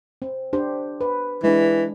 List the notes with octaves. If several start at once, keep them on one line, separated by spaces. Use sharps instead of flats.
C4
D4 G4 C5
B4
E3 G#3 D4